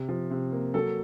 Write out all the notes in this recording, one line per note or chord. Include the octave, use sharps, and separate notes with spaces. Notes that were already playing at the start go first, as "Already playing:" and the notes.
Already playing: C3
F3
C3
A#3
F#3 A4